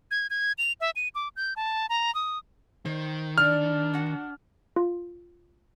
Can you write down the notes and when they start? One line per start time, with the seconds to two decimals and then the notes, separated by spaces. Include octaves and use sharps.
0.11 G#6
0.30 G#6
0.58 F7
0.81 E5
0.96 D#7
1.15 D6
1.36 G6
1.56 A5
1.89 A#5
2.15 D#6
2.85 D#3 C5
3.38 D4 D5 F6
3.94 F#4 F#5
4.76 F4